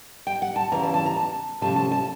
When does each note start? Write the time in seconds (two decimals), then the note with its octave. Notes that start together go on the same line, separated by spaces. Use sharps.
0.27 G5
0.42 F#5
0.56 A5
0.72 E2 C#3 E3 A#5
0.83 A5
0.94 A5
1.06 A#5
1.16 A5
1.61 C3 F3 A3 C#4 A5
1.76 A5
1.92 A5